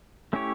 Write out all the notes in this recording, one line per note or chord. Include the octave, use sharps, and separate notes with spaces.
A3 C#4 E4 G4 C#5